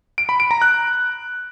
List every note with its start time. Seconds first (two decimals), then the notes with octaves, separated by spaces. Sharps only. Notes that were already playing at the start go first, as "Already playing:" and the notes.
0.18 D7
0.29 B5
0.40 D7
0.51 A#5
0.62 F#6